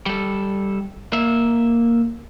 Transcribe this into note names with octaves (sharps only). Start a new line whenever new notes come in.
G3 A4
A#3 E5